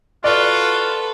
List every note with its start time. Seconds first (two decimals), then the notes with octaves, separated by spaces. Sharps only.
0.24 F4 F#4 A4 B4 D5